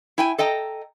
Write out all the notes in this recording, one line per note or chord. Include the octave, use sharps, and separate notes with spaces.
E4 G5 G#5
A4 D#5 G5 A#5